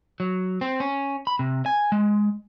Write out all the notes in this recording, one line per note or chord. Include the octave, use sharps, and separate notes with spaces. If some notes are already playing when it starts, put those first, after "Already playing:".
F#3
C4
C#4
B5
C3
G#5
G#3